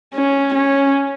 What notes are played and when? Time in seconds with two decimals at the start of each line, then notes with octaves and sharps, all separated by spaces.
0.14 C#4
0.55 C#4